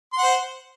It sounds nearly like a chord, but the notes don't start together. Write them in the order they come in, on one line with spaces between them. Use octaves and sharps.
C6 F#5 C5